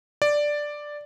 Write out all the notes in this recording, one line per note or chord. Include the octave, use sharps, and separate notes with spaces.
D5